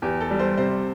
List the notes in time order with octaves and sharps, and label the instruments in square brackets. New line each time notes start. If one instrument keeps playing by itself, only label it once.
[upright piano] E2 [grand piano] G4
[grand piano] A4
[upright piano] G3
[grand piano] C5
[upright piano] C3 [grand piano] C5